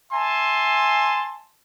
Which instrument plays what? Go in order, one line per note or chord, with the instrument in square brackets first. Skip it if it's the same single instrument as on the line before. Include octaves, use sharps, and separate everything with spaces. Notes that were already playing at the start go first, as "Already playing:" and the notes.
[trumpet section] E5 G#5 A5 C6